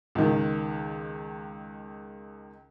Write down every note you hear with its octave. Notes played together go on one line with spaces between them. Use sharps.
C#2 D#3